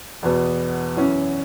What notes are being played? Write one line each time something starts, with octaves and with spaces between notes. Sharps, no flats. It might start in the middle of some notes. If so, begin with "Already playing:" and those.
E2 B2 B3
F#2 E3 C#4